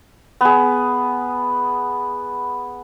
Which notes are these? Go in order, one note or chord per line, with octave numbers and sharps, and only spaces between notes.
B3 G#4